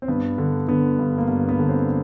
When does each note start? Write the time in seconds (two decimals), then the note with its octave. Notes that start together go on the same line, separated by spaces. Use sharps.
0.02 C4
0.08 G2 B3
0.38 D3
0.68 D3 B3
0.99 G2
1.18 A#3
1.28 G2 B3
1.49 B3
1.59 D3
1.69 C4